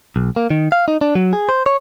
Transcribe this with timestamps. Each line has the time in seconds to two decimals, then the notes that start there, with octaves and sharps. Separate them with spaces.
0.16 B1
0.36 A#3
0.50 D#3
0.72 F5
0.88 D#4
1.01 D4
1.15 F#3
1.33 G#4
1.49 C5
1.66 C#5